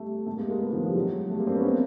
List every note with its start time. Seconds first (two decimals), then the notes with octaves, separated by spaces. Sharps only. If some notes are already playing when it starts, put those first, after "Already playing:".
Already playing: G3 A3
0.27 G3 A3
0.38 G#3 A#3
0.50 G#3 A#3
0.61 A3 B3
0.73 D#3 F3
0.84 F3 G3
0.95 F#3 G#3
1.30 G3 A3
1.39 G#3 A#3
1.47 C4 D4
1.56 B3 C#4
1.64 A#3 C4